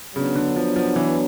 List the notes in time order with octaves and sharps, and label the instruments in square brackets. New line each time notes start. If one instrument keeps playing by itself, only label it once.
[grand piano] C#3 [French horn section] F#3 B3 D4
[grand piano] D3
F3
F3
E3